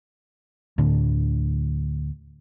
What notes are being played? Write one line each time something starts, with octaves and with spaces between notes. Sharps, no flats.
D2 A2 D3 D4